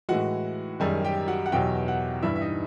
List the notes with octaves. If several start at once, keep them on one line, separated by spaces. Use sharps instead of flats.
A2 E3 G#3 F#4 F#5
F#2 D#3 G3 G#4 G#5
G4 G5
F#4 F#5
F#5
E2 B2 F#3 G4 G5
F#4 F#5
G2 E3 G3 E4 E5
E5
D#4 D#5